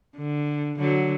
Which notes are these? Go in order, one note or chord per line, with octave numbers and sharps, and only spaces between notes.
D3
D3 F#3